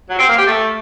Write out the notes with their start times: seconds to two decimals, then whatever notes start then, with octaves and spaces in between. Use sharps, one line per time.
0.08 F#3
0.18 C4
0.28 A#3
0.38 G4
0.47 A3